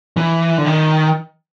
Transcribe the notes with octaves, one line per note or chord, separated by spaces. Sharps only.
E3
D3
D#3